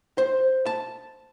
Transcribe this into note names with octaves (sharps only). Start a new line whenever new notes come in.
C5
A5